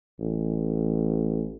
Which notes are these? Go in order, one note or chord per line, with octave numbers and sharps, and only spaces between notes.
A1